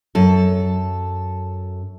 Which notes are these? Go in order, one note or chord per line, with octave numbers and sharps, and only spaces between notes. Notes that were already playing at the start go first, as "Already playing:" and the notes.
F#2 A4